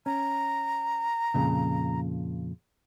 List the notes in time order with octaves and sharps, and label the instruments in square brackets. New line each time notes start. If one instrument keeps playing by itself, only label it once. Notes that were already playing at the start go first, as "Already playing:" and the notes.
[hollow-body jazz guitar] C#4 [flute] A#5
[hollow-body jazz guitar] F2 A#2 C#3